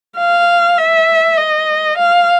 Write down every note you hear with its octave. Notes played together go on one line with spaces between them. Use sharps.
F5
E5
D#5
F5